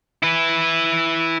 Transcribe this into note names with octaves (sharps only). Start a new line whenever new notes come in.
E4 B4